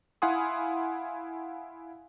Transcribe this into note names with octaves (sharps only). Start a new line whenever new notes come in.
E4 F5 F#5 G#5 C6 D#6